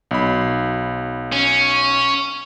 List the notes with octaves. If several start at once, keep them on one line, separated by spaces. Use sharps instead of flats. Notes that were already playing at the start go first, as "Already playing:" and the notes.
B1 B5
C#4